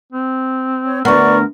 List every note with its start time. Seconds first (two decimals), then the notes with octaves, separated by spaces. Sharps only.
0.12 C4
0.85 C#5
1.05 D2 B3 A#4 B4 D5 C#6